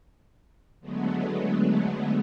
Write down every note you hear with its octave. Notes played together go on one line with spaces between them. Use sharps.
D3 F#3 G#3 A3 B3